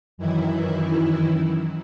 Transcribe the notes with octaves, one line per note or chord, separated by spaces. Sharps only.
F#2 D#3 E3 E4